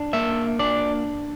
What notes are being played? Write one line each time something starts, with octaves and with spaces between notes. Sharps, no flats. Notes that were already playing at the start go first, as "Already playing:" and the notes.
Already playing: D4
A#3 E5
D4 D5